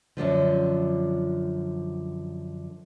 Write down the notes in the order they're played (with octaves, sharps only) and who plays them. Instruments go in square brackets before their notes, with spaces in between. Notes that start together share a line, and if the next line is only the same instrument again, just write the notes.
[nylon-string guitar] F#2 A#2 D3 F3